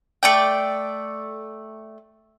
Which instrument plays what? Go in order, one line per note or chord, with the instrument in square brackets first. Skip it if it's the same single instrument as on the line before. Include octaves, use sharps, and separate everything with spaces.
[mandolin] A3 D5 G5